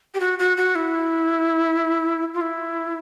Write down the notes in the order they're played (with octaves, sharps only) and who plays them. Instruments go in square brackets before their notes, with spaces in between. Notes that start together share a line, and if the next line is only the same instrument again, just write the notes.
[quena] G4
F#4
F#4
F#4
E4
F4
E4